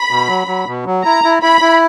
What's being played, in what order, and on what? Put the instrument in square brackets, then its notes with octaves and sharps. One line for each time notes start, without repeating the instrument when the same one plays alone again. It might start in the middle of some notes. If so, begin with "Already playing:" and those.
Already playing: [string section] B5
[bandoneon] B2
F#3
F#3
B2
F#3
[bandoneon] E4 [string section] A#5
[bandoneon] E4
[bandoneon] E4 [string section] B5
[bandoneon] E4